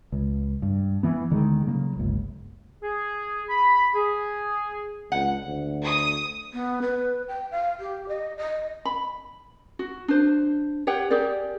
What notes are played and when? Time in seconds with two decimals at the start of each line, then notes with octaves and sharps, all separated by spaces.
0.12 C#2
0.62 G2
1.03 E3 B3
1.31 D2 D3 D#3 G#3
1.66 C#3 F#3 A#3
1.97 G1 C#2
2.83 G#4
3.49 B5
3.95 G#4
5.12 C#2 F#5
5.46 D2
5.85 D#6
6.54 B3
6.82 B4
7.28 G5
7.51 F5
7.80 G4
8.09 D#5
8.38 D#5
8.85 B5
9.79 F#4
10.08 D4 C5
10.87 G4 C#5 F#5 G5
11.10 G4 G#4 A#4 D5